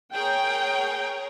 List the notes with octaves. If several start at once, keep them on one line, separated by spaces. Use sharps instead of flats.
G#4 A#4 C#5 G5